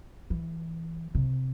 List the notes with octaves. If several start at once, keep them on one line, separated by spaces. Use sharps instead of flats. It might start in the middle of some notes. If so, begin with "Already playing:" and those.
E3
C3